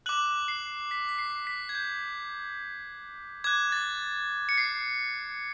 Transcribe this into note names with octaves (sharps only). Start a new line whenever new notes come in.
D6 F#6 F#7
C7
B6
B6
C7
B6
G#6
G6
D6 F#6 G#6
A6
C#7
C7